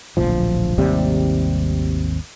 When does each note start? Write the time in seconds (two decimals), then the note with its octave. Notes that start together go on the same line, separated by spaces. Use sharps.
0.17 D1 A#1 F3
0.78 G#1 D#2 C3 G3